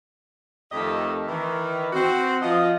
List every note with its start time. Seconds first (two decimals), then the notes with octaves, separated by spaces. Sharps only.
0.72 F2 D#3 A3 G4 A4 D#5
1.27 D#3 E3
1.92 C4 F#4
2.42 F3 D#5